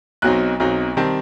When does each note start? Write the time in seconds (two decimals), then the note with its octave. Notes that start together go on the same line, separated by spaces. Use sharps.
0.22 B1 B2 F#3 C4 D#4 F#6
0.60 B1 B2 F#3 C4 D#4
0.97 D#3 G3 C4 A5